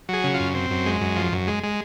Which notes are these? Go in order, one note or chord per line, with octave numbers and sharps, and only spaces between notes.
F#3 G#4
C#3
F4
F#2
C4
F#2
G#3
F#2
F3
F#2
G#3
G#3